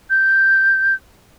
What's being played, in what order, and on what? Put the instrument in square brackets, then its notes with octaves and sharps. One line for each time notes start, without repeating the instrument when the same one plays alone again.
[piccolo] G6